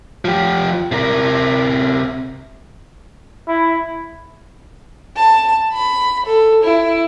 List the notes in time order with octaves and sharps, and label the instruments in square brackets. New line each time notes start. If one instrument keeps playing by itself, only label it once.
[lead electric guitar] F3 G4
C3 A#4
[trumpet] E4
[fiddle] A5
B5
A4
E4